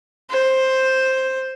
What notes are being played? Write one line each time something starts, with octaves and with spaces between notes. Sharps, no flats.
C5